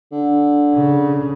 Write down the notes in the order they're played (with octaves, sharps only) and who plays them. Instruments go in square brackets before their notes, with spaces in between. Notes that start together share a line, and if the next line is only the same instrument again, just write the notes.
[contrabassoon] D3
[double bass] C#3